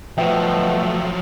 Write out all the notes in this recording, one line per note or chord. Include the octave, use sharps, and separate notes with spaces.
B2 F3 F#3 A3 E5 G5